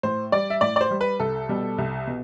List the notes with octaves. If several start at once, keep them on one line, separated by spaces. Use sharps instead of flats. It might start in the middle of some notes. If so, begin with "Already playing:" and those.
A2 C5
G3 D5
E5
A2 D5
D5
C5
G3
B4
C2 A4
B2 G3
C2
B2